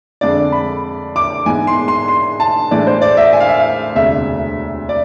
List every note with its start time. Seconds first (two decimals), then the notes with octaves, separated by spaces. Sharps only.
0.21 F2 D3 G#3 D4 D5
0.52 B5
1.16 D6
1.46 G#2 E3 B3 G#5
1.67 C6
1.88 C6
2.08 C6
2.40 A5
2.71 A2 E3 G#3 D4 D5
2.87 C5
3.02 D5
3.17 E5
3.33 G#5
3.40 F5
3.49 E5
3.56 F5
3.95 E1 D2 C3 E5
4.89 D5